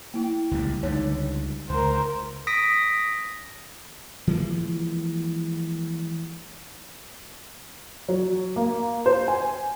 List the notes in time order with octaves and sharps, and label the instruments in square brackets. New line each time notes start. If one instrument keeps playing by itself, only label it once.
[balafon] A#3 E4 G5
[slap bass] C#2 A#2 G3
[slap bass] C#2 D3 G3 [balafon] D#4 C#5
[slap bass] C#2 [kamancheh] A#4 C5
[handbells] D#6 A#6 B6 D7
[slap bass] E3 F3 G#3 A#3
[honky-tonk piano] F#3
A#3
C5
G#5